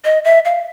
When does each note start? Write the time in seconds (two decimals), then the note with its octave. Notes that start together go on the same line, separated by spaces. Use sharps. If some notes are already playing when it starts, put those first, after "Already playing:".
0.05 D#5
0.25 E5
0.45 F5